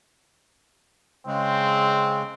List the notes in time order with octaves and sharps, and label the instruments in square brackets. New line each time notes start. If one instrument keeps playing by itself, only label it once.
[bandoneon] C#3 G#3 [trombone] C4